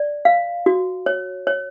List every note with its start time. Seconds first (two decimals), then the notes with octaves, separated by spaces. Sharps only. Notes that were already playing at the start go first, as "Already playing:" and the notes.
Already playing: D5
0.25 F5
0.66 F#4
1.06 C#5
1.47 C#5